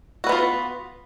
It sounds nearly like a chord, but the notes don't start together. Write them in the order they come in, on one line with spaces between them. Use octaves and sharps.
F#4 B4 B3 F4